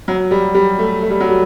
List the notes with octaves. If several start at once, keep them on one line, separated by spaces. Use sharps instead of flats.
F#3
G3
G3
A3
A3
G3
F#3
G3